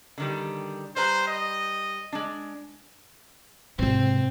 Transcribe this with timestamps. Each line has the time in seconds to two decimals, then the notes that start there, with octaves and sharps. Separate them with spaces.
0.18 D3 D#3 G3
0.96 G3 B4 C5 A#5
1.28 D#5
2.12 G#3 D4
3.79 G#2 C3 C4